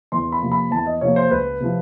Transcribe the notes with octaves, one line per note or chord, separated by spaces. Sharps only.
E2 C6
B5
C3 F3 A#3
B5
E2 A5
D#5
C3 F3 A#3 C#5
C5
C#2 B4
C3 F3